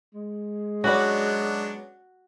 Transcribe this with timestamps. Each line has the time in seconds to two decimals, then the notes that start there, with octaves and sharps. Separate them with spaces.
0.14 G#3
0.84 F#3 B3 C#4 D4 F#4 B4 D5